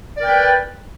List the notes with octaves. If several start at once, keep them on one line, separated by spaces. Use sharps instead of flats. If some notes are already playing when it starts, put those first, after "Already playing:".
A#4 B4 D5 G5